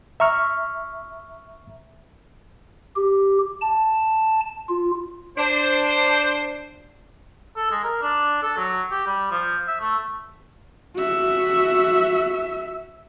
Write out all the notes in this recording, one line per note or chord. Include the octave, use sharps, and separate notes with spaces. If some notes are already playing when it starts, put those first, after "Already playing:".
E5 A#5 C#6 F6
G4
A5
F4
D4 C5
A4
G#3
A#4
D4
A4
F#3
G4
G3
F3
E5
A3
F#4 E5